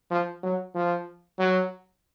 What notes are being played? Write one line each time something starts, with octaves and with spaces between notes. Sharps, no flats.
F3
F#3
F3
F#3